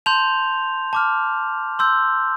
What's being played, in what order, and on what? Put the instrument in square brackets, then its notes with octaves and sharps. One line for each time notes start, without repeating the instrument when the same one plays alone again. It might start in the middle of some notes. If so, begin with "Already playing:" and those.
[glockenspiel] A5 C6 G6 F7
A5 D6 F6
C6 E6 G6